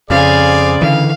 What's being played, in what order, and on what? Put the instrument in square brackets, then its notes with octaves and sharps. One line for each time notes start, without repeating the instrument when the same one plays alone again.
[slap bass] F2 [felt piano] C#3 [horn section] G#4 C5 D5 [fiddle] F5 G#5
[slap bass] D3 E3 [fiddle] F5